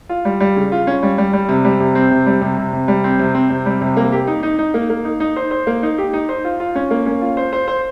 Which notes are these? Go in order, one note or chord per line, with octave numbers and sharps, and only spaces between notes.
F4
G3
G3
C#3
F4
C#4
G3
G3
G3
C3
G3
C3
C4
C3
G3
C3
C3
C3
G3
C4
C3
C4
C3
G3
C3
A#3
G4
D#4
D#4
D#4
A#3
A#3
D#4
D#4
C5
C5
A#3
D#4
G4
D#4
C5
F4
F4
C#4
A#3
C#4
F4
C5
C5
C5